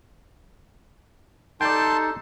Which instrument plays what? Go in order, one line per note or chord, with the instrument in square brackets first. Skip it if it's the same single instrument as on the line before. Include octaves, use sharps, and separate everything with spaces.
[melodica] D#4 [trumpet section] G4 A4 [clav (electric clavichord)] D5 G5 [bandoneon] A5 C6